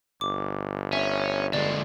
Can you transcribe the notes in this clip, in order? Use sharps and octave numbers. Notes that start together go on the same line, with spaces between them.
G1 D6
C#4 E5
D3 G#3 D5